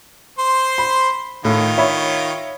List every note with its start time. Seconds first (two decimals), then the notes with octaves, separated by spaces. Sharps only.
0.38 C5 C6
0.78 B5
1.45 A2 D#3 F4
1.78 C#5 E5 B5